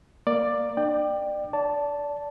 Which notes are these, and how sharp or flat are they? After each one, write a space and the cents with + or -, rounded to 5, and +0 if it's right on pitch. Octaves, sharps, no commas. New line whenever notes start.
A#3 +0 D5 +10
D4 +35 D5 +30 G5 +0
D5 -25 A5 +0